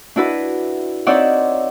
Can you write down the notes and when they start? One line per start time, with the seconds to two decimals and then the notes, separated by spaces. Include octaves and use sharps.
0.16 D4 E4 F#4 B4
1.06 C4 D#4 C#5 D5 E5 F#5